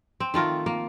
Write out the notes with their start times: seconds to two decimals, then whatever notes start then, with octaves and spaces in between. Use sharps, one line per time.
0.20 C4
0.34 D#3 A3 F4 A#4
0.66 A#3